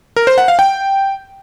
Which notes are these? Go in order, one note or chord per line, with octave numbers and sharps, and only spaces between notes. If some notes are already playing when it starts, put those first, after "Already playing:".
A#4
C5
F#5
F5
G5